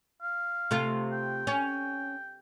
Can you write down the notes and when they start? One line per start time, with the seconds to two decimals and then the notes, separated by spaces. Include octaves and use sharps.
0.22 F5
0.71 C3 A3 F4
1.12 G5
1.47 C#4